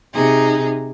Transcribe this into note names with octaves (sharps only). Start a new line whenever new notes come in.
C3 D#4 G#4